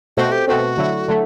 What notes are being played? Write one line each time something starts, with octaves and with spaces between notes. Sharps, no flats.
B2 A3 C4 F#4
G4
B2 A3 C4 F#4
D3 F#3 A3 E4
D3 F#3 A3